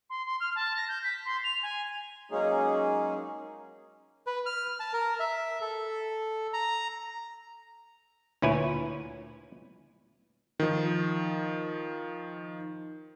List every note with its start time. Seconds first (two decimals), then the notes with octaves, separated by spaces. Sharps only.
0.10 C6
0.26 C6
0.40 F6
0.55 A5
0.76 A#6
0.88 G6
1.04 B6
1.25 C6
1.44 F7
1.62 G#5
2.31 F#3 G#3 A#3 C#4 D#4 G#4
4.27 B4
4.46 F6
4.80 A5
4.93 A#4
5.20 E5
5.61 A4
6.53 A#5
8.42 D2 A#2 E4 B4 C#5 G#5
10.60 D#3 F3